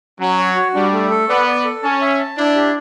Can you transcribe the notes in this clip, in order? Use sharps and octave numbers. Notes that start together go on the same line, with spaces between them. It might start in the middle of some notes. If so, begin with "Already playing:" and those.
F#3 C#4
C#5
F#4
G3 D4
A3
A4
B3 D5
D5
A4
C#4 A5
E5
A5
D4 E4
G4